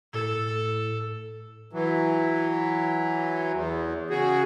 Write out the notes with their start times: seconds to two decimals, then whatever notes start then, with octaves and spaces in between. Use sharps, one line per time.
0.13 A2 A4
1.73 E3 F#3
3.53 E2
4.10 C#3 F#4 G#4